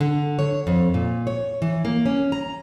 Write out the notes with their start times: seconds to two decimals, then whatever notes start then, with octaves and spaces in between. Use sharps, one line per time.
0.01 D3
0.39 C#5
0.67 F2
0.94 A#2
1.27 C#5
1.62 E3
1.85 A#3
2.06 C#4
2.32 A#5